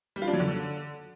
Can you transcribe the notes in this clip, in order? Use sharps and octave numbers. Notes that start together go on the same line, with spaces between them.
G3
F4
D4
F#3
D3